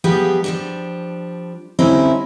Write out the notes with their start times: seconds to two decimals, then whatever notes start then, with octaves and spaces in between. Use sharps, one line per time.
0.04 F3 G3 B3 D#4 G4 G#4
0.44 F3 G3 D4
1.79 D3 G3 C4 C#4 D#4 E4